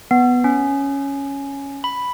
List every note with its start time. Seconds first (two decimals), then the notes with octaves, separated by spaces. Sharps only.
0.11 B3
0.44 C#4
1.84 B5